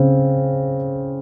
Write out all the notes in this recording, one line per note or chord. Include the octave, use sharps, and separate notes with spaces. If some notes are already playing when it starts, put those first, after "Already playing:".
Already playing: C#3 C4